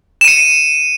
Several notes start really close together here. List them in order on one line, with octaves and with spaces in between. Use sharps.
E7 D#7 C#7